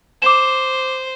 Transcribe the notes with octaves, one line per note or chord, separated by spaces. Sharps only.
C5 D6 E7